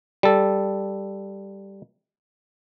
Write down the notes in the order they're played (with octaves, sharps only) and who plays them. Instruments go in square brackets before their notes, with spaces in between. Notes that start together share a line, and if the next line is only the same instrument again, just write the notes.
[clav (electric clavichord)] G3 A4